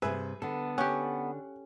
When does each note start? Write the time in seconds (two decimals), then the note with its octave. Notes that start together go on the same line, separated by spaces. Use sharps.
0.02 G2 C3 G#4 B4 E5
0.42 D3 B3 A4
0.78 C#4 G4 F#5